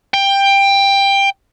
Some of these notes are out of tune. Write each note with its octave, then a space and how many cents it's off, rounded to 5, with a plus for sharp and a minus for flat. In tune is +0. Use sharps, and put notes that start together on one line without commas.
G5 +15